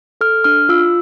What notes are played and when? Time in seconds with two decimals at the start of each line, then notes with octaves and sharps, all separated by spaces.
0.21 A4 F6
0.44 D4 F6
0.69 F4 E6